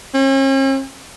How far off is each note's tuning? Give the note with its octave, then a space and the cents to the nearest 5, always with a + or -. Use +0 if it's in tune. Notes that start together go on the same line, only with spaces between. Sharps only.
C#4 -45